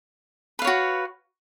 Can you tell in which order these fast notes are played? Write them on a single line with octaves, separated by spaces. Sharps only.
B4 F5 C#5 F#4